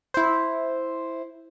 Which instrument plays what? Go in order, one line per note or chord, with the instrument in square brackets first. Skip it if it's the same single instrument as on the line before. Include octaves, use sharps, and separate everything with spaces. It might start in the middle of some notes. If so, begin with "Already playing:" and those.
[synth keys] E4 C5